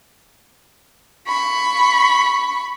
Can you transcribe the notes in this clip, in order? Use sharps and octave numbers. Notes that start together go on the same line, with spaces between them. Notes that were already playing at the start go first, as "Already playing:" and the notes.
B5 C#6